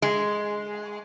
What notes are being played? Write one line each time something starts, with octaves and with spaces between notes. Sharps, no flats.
G#3